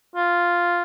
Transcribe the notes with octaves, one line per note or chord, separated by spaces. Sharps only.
F4